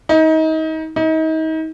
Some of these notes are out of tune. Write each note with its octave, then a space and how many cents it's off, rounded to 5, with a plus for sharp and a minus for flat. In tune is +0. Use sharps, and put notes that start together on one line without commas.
D#4 +30
D#4 +35